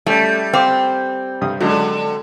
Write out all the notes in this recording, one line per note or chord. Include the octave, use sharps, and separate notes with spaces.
G3 A3 C#4
C4 F5 D6
G2 C3 D#6
D3 F#3 G#3 D4